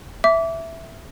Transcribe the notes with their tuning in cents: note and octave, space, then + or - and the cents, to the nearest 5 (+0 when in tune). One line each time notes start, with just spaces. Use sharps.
E5 +0 D6 -25